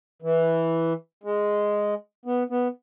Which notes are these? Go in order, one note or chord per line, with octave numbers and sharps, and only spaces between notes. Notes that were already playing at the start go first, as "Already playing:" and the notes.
E3
G#3
B3
B3